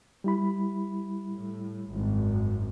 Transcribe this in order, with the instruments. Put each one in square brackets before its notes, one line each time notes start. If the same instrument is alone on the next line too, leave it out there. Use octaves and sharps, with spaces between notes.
[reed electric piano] G3 E4 B5
[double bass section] A2
G#1 F#2